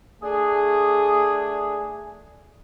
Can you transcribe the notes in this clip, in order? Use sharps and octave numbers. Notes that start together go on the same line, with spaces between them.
A3 D4 G#4